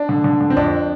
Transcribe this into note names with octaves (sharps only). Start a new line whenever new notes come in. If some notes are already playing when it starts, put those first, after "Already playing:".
Already playing: D4
D3
D3
D3
C4
F2 D4